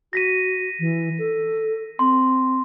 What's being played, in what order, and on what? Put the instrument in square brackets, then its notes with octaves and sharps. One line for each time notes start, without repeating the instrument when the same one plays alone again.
[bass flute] F#4 [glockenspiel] A#6 B6 D#7
[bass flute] E3
A4
[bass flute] C4 [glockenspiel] C6